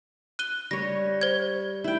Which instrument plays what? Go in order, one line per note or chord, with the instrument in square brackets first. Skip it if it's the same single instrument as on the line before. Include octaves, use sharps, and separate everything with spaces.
[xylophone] F#6 D#7 G7
[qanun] G3 C#5 [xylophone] A#6
[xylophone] C5 G#6
[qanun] E4 G5